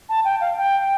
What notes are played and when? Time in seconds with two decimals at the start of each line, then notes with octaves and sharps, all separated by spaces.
0.09 A5
0.24 G5
0.40 F5
0.57 G5